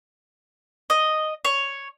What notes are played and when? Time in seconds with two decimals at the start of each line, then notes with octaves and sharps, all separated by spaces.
0.90 D#5
1.45 C#5